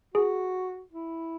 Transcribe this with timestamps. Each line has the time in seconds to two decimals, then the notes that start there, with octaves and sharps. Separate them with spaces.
0.15 F#4 G#4
0.92 E4